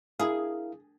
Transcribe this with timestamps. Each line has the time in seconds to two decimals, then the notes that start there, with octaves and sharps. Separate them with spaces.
0.20 E4 G#4 A#4 F5